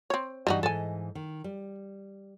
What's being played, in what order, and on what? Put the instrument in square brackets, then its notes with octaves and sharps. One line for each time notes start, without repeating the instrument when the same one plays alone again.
[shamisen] C4 C#5
[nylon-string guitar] G2 E3 [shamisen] G3 D#4 F#4
[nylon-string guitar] G#2 E3 D#5 [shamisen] A4 G#5
[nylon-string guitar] D#3
G3